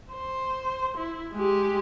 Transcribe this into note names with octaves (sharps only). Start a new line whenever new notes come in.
C5
E4
G#3 G4